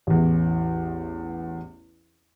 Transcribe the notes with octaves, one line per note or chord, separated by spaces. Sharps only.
A1 E2